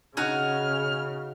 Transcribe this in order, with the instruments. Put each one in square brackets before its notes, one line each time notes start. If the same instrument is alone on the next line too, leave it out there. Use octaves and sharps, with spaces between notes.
[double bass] C#3 [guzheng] D#4 F#4 G#5 [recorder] F6